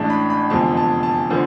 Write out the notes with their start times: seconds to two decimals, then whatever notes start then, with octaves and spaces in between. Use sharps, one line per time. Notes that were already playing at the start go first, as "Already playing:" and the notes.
Already playing: A1 A2 G#3 D4 A5
0.10 B5
0.30 B5
0.50 F1 E2 D3 F3 G#3 A5
0.77 A5
1.03 A5
1.30 D3 F3 B3